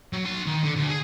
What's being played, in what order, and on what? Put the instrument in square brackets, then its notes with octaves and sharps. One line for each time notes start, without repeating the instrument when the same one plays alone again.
[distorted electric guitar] F#3
F#4 C6
D#3
D3
D2
G#4